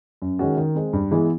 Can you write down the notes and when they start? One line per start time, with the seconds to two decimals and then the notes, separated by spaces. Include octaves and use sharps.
0.22 F#2
0.39 D#3 G#3 C#4 F#4
0.57 D#3
0.75 G#3 C4
0.93 G2
1.11 E3 G#3 B3 E4